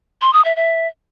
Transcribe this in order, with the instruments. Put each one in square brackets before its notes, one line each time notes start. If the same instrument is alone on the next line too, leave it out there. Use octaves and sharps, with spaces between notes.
[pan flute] C6
D#6
E5
E5